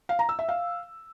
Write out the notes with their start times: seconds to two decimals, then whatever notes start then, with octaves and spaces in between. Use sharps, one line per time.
0.09 F5
0.19 A#5
0.29 E6
0.39 E5
0.49 F5